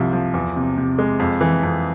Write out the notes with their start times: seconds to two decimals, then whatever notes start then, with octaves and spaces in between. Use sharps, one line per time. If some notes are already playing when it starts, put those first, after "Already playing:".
Already playing: C2 C3 F3
0.13 F3
0.34 E2
0.56 C3
0.78 C3
0.99 G#3
1.19 F2
1.41 E3
1.63 F2